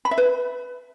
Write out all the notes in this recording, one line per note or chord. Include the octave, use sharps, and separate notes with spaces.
B5
E5
B4